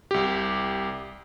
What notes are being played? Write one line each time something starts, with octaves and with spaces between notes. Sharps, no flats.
C2 G4